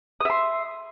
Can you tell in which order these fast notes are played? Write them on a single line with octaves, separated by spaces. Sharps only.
D#6 E5 C6